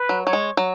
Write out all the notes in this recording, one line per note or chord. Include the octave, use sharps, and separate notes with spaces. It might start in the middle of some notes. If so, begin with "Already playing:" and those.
Already playing: B4
F#3
F#3 C#5
G#3
F#3